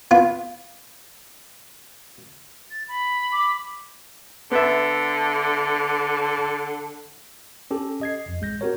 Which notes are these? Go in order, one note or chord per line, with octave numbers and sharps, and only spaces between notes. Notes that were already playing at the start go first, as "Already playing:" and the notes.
B3 F4
A6
B5
D6
D3 B3 E5
C#4 G4 A4
D#5 G#6 C7
F2
A1 G#3 G6 A#6
C4 F#4 G4 A#4 C#5